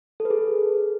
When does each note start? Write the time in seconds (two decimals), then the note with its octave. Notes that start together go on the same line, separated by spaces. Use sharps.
0.20 A4
0.25 B4
0.30 G#4